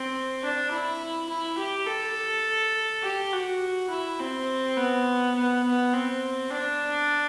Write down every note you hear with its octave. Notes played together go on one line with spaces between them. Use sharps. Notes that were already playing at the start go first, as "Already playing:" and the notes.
Already playing: C4
D4
E4
E4
G4
A4
G4
F#4
E4
C4
B3
B3
B3
C4
D4